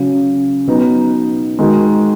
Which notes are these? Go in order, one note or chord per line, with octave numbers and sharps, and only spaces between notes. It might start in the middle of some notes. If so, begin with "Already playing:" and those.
Already playing: C#3 F#3 C#4
B2 F#3 B3 D#4
D#3 G#3 D#4 F#4